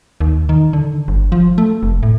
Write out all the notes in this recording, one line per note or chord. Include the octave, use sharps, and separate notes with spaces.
D#2
D#3
D3
G1
F3
A3
F1
A2